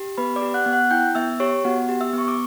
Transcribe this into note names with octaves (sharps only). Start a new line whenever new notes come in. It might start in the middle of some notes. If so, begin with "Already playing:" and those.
Already playing: G4
B3 B4 B5
D5 D6
G4
F#5 F#6
B3
F#5 F#6
E4 G5 G6
B3 E5 E6
G4 C#5 C#6
B3 F#4 F#5
G4
E5 E6
B3
C#6
D6